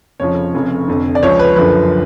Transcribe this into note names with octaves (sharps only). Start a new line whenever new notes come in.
F1 F2 C#3 F3 C#5
F1 F2 C#3
F1 F2 D3
D5
C#2 C#3 F3 C#5
B4
F#1 F#2 D3 F3 B4